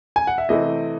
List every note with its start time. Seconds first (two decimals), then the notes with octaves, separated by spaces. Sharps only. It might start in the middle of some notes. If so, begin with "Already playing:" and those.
0.16 G#5
0.27 F#5
0.38 E5
0.49 C3 E3 A3 C4 D#5